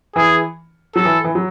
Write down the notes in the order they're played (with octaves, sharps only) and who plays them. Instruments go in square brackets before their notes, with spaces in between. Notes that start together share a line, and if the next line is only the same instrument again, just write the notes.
[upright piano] E3 [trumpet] G#4
[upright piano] F#3 [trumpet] A4
[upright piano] E3
E3
F#3